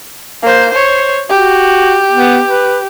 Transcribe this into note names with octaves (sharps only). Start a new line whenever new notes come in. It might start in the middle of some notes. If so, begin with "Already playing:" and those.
A#3 C5
C5 C#5
F#4 G4
B3
B4